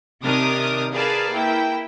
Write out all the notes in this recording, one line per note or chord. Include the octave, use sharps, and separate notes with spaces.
C3 D#3 D4 D6 D#6 F6
G#4 A#4 B4 D5 F5 A5
A#3 E4 G5